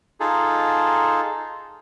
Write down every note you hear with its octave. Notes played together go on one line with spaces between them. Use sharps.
D#4 F4 G#4 A4